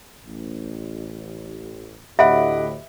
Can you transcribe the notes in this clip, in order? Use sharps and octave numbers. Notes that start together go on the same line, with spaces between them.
A1
D2 A2 G4 D#5 E5 F#5 B5 D7